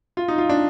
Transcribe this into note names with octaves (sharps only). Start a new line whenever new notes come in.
F4
D#4
F4
D4